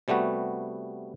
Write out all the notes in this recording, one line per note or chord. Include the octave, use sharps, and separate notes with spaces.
C3 G3 A3 B3 F#4